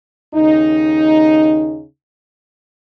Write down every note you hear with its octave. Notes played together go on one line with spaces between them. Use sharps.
D#2 C#3 D#4